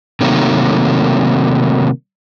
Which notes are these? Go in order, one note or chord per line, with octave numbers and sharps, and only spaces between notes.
C3 D#3 F#3 A3 A#3